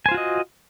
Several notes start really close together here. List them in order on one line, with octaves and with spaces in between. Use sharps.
G#5 C5 F4 F#4 D#5